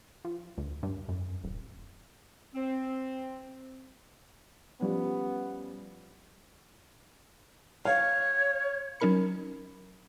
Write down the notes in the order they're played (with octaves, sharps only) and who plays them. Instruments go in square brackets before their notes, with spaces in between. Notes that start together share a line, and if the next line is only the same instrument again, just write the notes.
[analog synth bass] F3
D2
G2
F#2
D#1
[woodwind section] C4
[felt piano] F3 G3 C#4 [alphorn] B3
[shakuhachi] C#5 [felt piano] F5
[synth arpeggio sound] F#3 C#4 D#4 A#4 B5 C#7